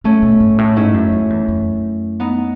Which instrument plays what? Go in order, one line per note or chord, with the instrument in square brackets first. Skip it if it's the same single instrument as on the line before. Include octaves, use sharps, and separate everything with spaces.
[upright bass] C#3 [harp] A3 C#4
[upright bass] B2
G#2
A2
[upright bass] G#2 [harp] C#4 E4
[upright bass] F#2
F#2
E2
F#2
[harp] B3 D#4